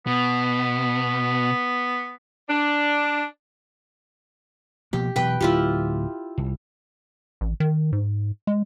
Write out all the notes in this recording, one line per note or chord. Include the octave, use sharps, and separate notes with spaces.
B2 B3
D4
B2 F3 A#3 G4
B2 E3 F#3 B4 G5
D1 F#3 E4 F4 G4
C2
A1
D#3
G#2
G#3